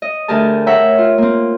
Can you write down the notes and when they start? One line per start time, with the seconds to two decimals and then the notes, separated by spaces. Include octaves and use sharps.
0.02 D#5
0.28 D2 G4 G#4 A#4 A5
0.67 C#5 E5 F#5 G5 A#5
0.98 F4
1.18 A#3 C4